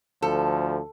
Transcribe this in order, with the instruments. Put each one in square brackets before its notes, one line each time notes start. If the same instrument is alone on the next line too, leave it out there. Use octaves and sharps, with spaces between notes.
[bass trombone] D2 [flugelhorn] F3 [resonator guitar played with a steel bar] A4